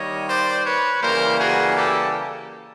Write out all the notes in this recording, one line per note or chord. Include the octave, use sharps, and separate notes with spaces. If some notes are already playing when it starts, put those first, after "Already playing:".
Already playing: D#3 G3 A#3 C#5 D#5
C5 D5
B4 C#5
C#3 E3 G3 A#3 A#4 C5
F#4 G#4
G4 A4